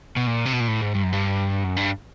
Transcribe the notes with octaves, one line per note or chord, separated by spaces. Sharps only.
B2
A#2
C3
B2
A#2
A2
G#2
G2
F#2
G2
F#2
G2